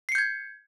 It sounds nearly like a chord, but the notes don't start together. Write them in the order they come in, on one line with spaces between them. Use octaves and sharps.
C7 C#7 G6 G#6